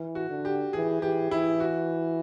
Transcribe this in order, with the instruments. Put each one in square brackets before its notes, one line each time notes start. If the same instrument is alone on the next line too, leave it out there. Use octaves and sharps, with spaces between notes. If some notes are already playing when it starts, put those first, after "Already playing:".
Already playing: [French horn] E3
[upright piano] F#4
[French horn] D3
[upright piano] G4
[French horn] E3 [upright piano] G#4
[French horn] E3 [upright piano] G4
[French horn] E3 [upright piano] E4
[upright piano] F#4